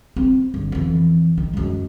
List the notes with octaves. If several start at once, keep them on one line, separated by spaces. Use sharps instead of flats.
C4
G1
F2 E3
D#3
F#2 G#3